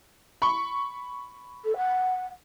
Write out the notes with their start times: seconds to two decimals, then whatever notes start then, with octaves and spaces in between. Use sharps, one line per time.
0.42 B5 C#6
1.64 A4
1.76 F#5